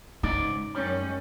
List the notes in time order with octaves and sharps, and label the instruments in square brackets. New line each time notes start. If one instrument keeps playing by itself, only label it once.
[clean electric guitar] C#2 G#2 D5 [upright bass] D#4
[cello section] F#2 G#3 C#4 [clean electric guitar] G3